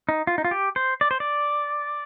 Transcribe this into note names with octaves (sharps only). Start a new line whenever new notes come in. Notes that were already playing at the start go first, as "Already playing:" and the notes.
D#4
F4
D#4
F4
G4
C5
D5
C5
D5